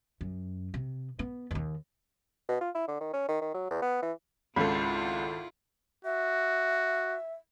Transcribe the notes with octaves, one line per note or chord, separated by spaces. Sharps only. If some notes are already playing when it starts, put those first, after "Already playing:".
F#2
C3
B3
D#2 D#3
B2
F4
E4
D3
D#3
C#4
D#3
D#3
F#3
E2
B3
E3
G#1 C#2 E4 F4 A4 B5
F#4 E5